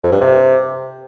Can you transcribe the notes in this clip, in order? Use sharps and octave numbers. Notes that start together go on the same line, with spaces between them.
F2
G2
C3